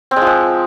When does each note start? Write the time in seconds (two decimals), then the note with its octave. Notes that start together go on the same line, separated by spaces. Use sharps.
0.11 C4
0.16 G#3
0.22 F3
0.27 G#3